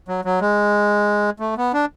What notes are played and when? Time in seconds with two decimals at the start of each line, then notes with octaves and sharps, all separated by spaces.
0.08 F#3
0.25 F#3
0.41 G#3
1.40 A3
1.57 B3
1.73 D4